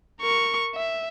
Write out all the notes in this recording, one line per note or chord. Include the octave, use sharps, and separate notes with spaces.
A#4 C#6
E5